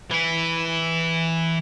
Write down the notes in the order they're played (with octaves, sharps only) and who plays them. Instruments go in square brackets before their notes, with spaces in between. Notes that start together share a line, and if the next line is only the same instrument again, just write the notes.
[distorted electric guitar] E3 E4